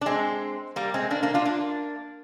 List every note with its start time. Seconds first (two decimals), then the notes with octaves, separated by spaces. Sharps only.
0.01 D4
0.06 G#3 C4
0.76 G3 A#3
0.94 G#3 C4
1.10 A#3 D4
1.23 A#3 D4
1.34 D4 F4
1.45 A#3 D4